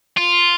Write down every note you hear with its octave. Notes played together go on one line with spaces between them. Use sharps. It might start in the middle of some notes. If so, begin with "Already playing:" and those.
F4